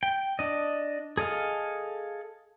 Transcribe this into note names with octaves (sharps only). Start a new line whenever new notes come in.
G5
D4 D#5
G#4 A4 D#5 F5